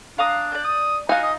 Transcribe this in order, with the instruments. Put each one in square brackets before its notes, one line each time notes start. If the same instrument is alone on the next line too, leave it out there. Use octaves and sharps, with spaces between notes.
[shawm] D4 [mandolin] F5 A#5 D#6
[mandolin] D5 G6
[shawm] D#6
[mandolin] D#4 F4 [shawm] F#4 [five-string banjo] F5 G#5
[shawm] D#5